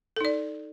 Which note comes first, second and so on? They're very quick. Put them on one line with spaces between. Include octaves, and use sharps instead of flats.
A4 D#4 D5